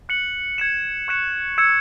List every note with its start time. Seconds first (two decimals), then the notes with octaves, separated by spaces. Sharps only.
0.09 F#6 C#7 F#7
0.58 G#6 C#7 E7
1.08 C#6 F#6 C#7 E7
1.58 E6 G#6 C#7 E7